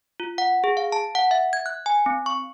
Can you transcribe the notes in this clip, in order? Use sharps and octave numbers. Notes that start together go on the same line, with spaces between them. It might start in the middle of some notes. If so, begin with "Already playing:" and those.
F4
F#5
G#4
F5
A5
F#5
E5
G#6
F#6
G#5
C4
C#6